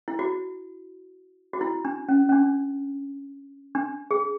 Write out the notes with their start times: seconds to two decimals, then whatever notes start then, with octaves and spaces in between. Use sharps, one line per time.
0.08 E4
0.19 F#4
1.53 F#4
1.61 E4
1.85 D4
2.09 C#4
2.29 C#4
2.32 D4
3.75 D4
4.11 G#4